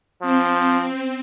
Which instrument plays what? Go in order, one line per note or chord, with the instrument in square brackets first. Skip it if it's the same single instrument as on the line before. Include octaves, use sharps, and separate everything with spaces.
[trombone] F3 [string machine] C4